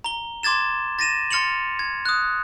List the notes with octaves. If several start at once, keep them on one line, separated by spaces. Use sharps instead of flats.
A#5 G7
C6 D6 G#6 A6 E7
A6 A#6 D#7 E7
C6 F6 A6 C#7 F7 F#7
G#6
D#6 F#6